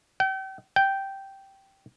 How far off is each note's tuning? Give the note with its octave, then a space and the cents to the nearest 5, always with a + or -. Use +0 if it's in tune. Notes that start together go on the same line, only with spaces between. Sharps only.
G5 -35
G5 -5